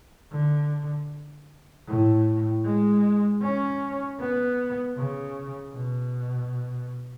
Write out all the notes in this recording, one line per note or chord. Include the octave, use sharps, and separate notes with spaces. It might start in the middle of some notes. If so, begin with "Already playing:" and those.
D3
A2
G#3
C#4
B3
C#3
B2